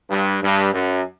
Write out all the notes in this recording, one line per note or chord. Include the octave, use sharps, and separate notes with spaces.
G2
G2
F#2